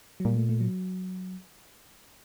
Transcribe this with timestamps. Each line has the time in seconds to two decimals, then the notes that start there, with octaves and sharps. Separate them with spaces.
0.20 F#3
0.25 A#2 G3
0.36 A3
0.49 A3
0.60 F#3